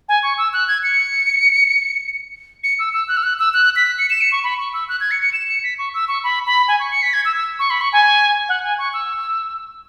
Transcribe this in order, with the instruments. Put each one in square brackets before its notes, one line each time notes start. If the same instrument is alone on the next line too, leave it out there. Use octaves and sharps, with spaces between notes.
[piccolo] G#5
C#6
E6
F#6
G#6
C#7
C#7
E6
E6
F#6
E6
F#6
E6
F#6
B6
C#7
E7
C#7
C#6
B5
C#6
E6
F#6
G#6
C#7
C#7
E7
C#7
B6
C#6
E6
C#6
B5
B5
G#5
C#6
C#7
B6
G#6
E6
E6
C#6
B5
C#6
G#5
F#5
G#5
C#6
E6